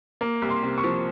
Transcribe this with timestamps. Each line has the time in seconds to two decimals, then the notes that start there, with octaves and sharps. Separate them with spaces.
0.21 A#3
0.42 C2
0.49 C6
0.63 C3
0.78 C#6
0.84 F3